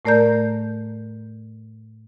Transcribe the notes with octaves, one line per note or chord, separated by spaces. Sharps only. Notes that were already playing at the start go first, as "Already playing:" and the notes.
A2 A3 A#4 D5 A#5 G6